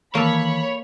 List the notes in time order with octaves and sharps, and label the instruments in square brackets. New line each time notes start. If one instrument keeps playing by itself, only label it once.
[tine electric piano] D#3 E3 [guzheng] A#3 A4 [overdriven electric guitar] C#5 [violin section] B5